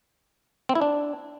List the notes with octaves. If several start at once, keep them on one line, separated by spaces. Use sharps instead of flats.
C4
E4
D4